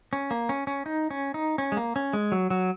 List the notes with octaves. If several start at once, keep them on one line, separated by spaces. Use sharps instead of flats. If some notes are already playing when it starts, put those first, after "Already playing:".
C#4
A#3
C#4
C#4
D#4
C#4
D#4
C#4
G#3
A#3
C#4
G#3
F#3
F#3